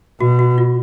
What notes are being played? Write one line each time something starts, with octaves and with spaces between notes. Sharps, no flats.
B2 F#4
F#4
F4